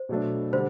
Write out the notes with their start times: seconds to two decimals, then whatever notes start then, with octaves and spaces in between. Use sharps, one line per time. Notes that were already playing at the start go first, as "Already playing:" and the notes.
Already playing: C5
0.09 B2 F#3 A3 D4
0.53 D3 G3 C5